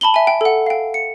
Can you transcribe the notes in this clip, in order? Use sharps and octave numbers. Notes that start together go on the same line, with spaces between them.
A5 B5 F#7 G7
E5 G#5
G5
A4 F#5
F5 G5
C#7